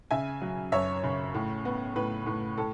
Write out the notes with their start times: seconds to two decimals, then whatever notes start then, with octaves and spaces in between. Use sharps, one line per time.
0.11 C#3 E5 G#5
0.42 F#3
0.72 F#2 C#5 E5
1.04 C#3
1.34 A2
1.65 B3
1.96 A2 B4
2.26 A2
2.57 A2 A4